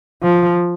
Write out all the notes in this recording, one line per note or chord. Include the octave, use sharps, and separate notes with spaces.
F3